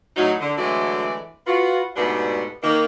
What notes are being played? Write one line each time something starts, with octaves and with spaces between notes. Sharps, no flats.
A2 F#3 D#4
D3
D3 E3 F#3 G#3 A3 D5
F4 F#4 B4
G#2 B2 G3 A3 B3 D4
D#3 A#3